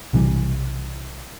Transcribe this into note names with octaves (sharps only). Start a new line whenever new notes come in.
B1 C3 E3 G3